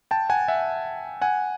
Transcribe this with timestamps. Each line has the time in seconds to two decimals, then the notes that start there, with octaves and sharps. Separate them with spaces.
0.11 G5 A5
0.30 F#5 G#5
0.48 E5 F#5
1.22 F#5 G#5